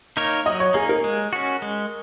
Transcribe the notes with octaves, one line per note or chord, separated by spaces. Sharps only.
A#3 D#4 A#4 C#5
F#3 D#5
C#5
A#3 D#4 G#4
A#4
G#3
C#4 F#4
G#3